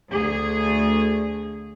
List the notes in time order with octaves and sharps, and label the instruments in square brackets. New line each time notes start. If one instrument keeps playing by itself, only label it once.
[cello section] D2 G#4